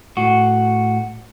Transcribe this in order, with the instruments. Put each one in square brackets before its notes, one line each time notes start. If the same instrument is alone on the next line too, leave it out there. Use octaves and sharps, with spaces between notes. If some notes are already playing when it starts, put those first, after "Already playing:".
[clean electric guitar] A2 F#4